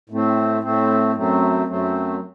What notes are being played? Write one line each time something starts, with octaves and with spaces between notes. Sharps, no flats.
A2 A3 C4
A2 A3 C4
F#2 F#3 A3 C4
F#2 F#3 A3 C4